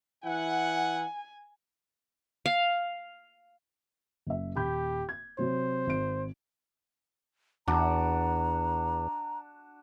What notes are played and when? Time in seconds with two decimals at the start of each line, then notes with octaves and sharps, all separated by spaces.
0.24 E3 E4 F#5 G#5
2.46 F5
4.27 F#1 E5
4.56 D#1 G4 B5 G6
5.09 G#6
5.38 C3 F#3 C5
5.87 G#1 D7
7.68 E2 D4 F#4 A#5